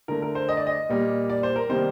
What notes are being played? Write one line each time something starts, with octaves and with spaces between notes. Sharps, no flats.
D3 A3 A#4
A#4
C5
D#5
D5
D#5
A#2 G3 A#3
D5
C5
A#4
C3 D#3 G3 A#3 C5